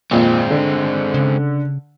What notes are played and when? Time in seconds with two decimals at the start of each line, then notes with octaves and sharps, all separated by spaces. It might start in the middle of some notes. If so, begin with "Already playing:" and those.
0.11 F2 A#2 G#3 C4
0.51 D3
1.14 C#3